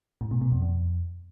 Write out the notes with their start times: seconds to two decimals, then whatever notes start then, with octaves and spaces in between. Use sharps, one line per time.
0.21 A2
0.31 B2
0.41 B2
0.52 F2
0.62 F2